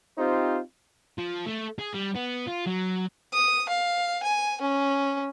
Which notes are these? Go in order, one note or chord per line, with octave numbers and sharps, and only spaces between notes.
C4 D#4 F4 G4 C5
F3
A3
G#4
G3
B3
F4
F#3
D#6
F5
G#5
C#4